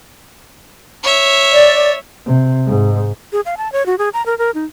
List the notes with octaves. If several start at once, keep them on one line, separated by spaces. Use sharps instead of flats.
C#5 E5
D5
C3
G#2
G#4
F5
A5
C#5
F#4
G#4
A#5
A#4
A#4
D#4